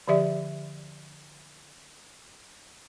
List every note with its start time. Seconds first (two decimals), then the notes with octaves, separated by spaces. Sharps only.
0.08 D3 F3 G4 D5 E5